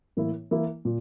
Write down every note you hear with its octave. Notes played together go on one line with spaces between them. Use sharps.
A2 E3 A#3 E4
E3 A#3 E4
A#2